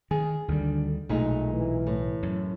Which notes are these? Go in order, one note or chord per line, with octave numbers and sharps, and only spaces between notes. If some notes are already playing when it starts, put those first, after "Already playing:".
D#3 G#4
D2 D3 D#3 G3
B1 A#2 G#3 A3 D#4
E3
A2
F#2